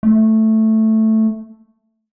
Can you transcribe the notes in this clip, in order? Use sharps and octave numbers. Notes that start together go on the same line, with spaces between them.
A3